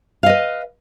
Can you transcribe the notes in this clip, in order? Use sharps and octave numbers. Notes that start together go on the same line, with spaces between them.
B4 D#5 F5